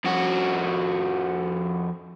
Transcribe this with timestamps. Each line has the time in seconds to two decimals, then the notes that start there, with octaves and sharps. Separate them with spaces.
0.04 F2 F#4